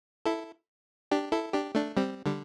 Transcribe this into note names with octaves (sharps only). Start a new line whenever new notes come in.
E4 A4
D4 G4
E4 A4
D4 G4
A3 D4
G3 C4
D3 G3